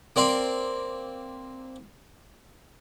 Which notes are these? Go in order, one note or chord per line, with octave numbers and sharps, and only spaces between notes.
A#3 C4 D5 F5